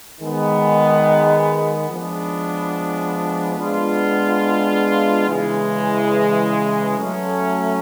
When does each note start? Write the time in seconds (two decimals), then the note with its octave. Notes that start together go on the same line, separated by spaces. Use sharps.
0.19 D#3 G#3 B3
1.89 F3 G#3 B3 D4
3.59 G#3 B3 D4 F4
5.28 C#3 E3 G#3
6.98 F#3 A3 C#4